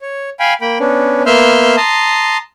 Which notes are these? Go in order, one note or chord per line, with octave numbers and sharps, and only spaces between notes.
C#5
F5 G5 G#5 B5
A#3 G5 B5
B3 C#4 D4
A#3 B3 E5 C6 F6 G6
A5 A#5 C6 D#6